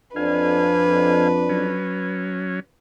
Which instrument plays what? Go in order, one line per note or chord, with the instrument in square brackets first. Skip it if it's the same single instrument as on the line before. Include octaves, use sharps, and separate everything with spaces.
[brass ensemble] F2 D4 [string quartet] B4 [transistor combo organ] F5 G#5
[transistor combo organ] F#3 C#4